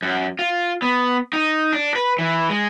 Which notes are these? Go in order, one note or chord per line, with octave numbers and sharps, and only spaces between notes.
F#2
F4
B3
D#4
D4
B4
E3
G#3